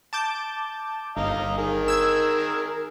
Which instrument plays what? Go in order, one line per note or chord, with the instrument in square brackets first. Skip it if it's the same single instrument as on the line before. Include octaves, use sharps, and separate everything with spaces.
[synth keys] A5 D6 G6
[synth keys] G1 [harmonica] D#5 F5 A#5
[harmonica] D#3 G#4 A#4
[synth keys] E6 G#6